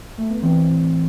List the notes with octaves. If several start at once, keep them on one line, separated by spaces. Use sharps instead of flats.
A3
B3
E3 C4
A2